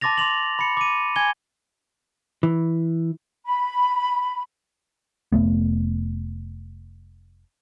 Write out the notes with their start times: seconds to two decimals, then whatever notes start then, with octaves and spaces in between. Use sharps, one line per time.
0.01 A5 C6 D6 A6 A#6 F7
0.18 C6 D6 F7 F#7
0.59 B5 C#7
0.77 D6 D#7
1.16 G#5 G#6 G7
2.43 E3
3.45 B5
5.32 F1 G#2 A3 B3